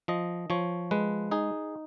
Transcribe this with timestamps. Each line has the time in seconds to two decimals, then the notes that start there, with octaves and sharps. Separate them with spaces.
0.08 F3 D#5
0.50 F3 C#5
0.91 G#3 B4
1.31 D#4 G#4